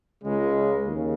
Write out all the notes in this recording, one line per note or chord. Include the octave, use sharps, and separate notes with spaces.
C#2 C#3 G#3
D#2 C#3